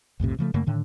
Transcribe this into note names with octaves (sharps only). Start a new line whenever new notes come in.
B1 F2 A2 C3
C#3 F3 A3
F#2 C#3 A3 A#3
A2 D3 D#3